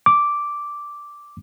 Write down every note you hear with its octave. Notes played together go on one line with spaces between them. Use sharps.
D6